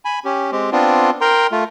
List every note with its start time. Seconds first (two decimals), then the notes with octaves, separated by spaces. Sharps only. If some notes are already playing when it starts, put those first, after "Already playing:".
0.05 G#5 B5
0.25 C#4 G4
0.52 G#3 C4 G4
0.72 B3 C4 D4 F4
1.21 A#4 G5 A#5 C6
1.52 A3 F4